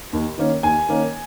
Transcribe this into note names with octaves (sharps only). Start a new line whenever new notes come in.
D#2
D#3 A#3 C#4
D#2 G#5
D#3 A#3 C#4